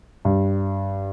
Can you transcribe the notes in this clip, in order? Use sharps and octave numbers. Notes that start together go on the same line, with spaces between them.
G2